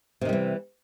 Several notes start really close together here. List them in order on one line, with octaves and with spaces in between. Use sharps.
C3 D#3 G3 E3